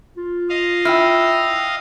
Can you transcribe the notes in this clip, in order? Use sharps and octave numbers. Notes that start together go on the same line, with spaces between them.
F4
D#5 F5
E4 G5 E6 F6